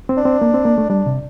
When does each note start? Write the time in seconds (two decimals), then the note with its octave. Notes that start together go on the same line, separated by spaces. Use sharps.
0.09 C4
0.17 D4
0.25 C4
0.41 A#3
0.54 C4
0.65 A#3
0.78 A3
0.90 G3 D4
1.06 C3